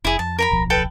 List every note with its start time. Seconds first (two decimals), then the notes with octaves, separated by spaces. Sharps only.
0.05 F1 E4 G#4
0.19 F2 A5
0.39 A#4 A#5 B5
0.51 D1 B1 F3
0.70 A4 B4 G5